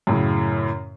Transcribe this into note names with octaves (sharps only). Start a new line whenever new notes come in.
F#2 A2 C#3